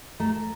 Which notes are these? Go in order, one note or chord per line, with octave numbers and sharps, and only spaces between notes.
A3 A#5